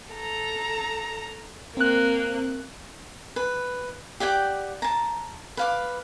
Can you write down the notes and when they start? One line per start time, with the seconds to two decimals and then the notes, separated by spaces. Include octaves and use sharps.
0.13 A4 A#5
1.77 A#3 C4 F#6
3.36 B4
4.20 G4 D5 F#5 G5
4.82 A5 A#5
5.57 B4 F5 D6